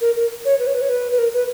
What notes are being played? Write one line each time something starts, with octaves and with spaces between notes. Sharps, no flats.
A#4
A#4
C#5
B4
C#5
B4
C#5
B4
B4
A#4
B4